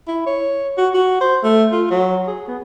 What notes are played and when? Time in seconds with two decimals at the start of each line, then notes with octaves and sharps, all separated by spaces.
0.08 E4
0.26 C#5
0.78 F#4
0.94 F#4
1.21 C5
1.43 A3
1.72 F4
1.91 F#3
2.27 G#4
2.48 B3